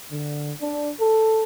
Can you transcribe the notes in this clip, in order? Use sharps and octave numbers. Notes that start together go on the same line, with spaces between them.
D3
D4
A4